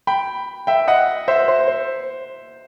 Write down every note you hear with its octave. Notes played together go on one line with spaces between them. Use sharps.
G5 B5
E5 G5
D#5 F#5
C5 E5
C5
C5